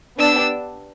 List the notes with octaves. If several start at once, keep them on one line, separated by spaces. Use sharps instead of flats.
B3 D4 G4 D5 E6